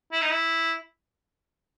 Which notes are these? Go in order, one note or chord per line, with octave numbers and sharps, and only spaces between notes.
E4
D#4
E4